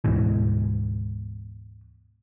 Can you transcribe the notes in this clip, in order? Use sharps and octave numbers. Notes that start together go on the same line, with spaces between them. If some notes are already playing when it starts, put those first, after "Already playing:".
D2 G#2 B2 E3